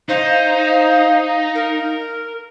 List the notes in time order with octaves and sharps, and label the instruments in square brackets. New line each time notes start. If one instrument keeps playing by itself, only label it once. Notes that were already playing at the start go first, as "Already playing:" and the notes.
[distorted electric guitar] D#4 [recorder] C5 [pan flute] F5
[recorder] A#4